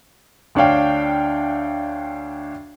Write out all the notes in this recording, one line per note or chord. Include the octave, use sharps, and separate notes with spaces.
D2 D4 C#5 F5 G5